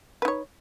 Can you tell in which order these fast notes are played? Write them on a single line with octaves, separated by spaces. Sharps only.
B4 D#4 C#5